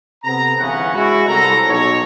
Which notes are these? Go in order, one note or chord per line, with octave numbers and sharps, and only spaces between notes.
C3 B3 A4 A#5
G1 C#3 E3 B3 C#4 F#5
G#3 C#4 E4 F#4
C2 A4 A#5
B1 C#5